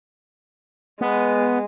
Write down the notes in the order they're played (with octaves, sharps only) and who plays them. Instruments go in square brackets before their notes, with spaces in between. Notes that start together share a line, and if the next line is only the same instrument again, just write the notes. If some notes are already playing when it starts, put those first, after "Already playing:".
[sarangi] G#3 [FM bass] B3